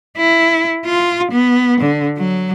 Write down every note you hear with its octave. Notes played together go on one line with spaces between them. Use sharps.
E4
F4
B3
D3
F#3